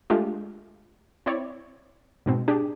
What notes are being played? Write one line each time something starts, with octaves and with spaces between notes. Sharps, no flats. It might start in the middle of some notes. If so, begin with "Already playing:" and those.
G#3 A3 D4 F4 G4
C4 E4 C#5 D5
G#2 B2 C4
D4 G4 G#4